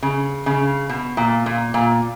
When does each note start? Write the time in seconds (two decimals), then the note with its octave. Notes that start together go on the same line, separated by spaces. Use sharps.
0.02 C#3
0.46 C#3
0.89 B2
1.17 A#2
1.46 A#2
1.74 A#2